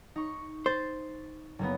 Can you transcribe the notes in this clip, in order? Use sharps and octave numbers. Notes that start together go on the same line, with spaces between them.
D#4 C#6
C5 A6 C7
F#1 A#3 B3